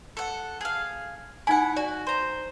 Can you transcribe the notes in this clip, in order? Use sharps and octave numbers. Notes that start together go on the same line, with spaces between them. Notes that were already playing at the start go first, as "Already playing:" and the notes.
A4 F#5
G#4 F5
D#4 E4 F#5 G#5
F#4 D5
C5 A#5